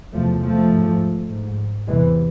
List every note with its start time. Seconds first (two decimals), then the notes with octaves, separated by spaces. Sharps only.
0.13 E2 C3 F3 A3
0.42 F3 A3
0.71 G#2
1.29 G#2
1.88 E2 C3 E3 G#3